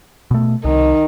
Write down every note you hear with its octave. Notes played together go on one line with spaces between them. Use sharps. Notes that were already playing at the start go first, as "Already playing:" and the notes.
B2 A3
C2 D#3